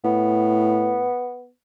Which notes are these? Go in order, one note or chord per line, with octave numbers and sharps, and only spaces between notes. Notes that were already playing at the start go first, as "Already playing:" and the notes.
A2 B3